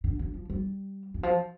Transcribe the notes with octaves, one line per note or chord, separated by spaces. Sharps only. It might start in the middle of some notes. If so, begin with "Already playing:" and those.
D3
D3
F3
G3
E3
F3